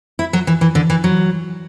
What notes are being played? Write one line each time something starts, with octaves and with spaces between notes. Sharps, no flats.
E4
F#3
E3
E3
D3
E3
F#3